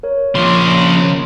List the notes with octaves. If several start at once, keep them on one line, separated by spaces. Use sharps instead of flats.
A#4 C#5
C#3 F3 A#3 C6